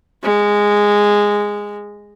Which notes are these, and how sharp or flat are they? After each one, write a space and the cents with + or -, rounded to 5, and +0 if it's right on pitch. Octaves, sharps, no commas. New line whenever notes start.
G#3 -10